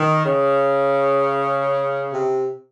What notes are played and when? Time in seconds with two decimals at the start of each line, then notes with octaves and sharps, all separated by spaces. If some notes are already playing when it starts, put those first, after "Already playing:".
Already playing: D#3
0.25 C#3
2.12 C3